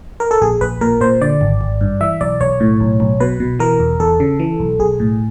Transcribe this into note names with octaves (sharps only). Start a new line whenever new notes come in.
A#4
A4
A#1 G#4
A#1 B4
A#2 A#4
A#2 C5
D3 D5
G#1
G#1
G2
E3 E5
B1 D5
B1 C#5
A2
B1
B1
B2 B4
B2
E3 A#4
E2
E2 A4
C#3
E3
B1
B1 G#4
A2